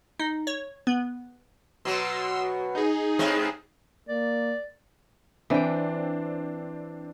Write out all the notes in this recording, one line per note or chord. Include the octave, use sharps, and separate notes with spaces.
D#4
C#5
B3
B2 F#3 C6 E6
D#4 G#4
G#2 G#3 C4
A#3 D5
E3 C4 D4 G5